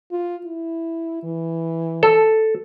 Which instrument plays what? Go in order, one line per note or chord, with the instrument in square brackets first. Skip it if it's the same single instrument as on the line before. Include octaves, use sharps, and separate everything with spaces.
[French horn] F4
E4
E3
[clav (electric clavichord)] A4